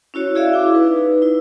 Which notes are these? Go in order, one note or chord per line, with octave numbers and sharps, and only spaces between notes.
C#4 E4 F#4 C#5
E4 F#4 G#4 D5 E5 F5
E4 D6
D#4 B4
E4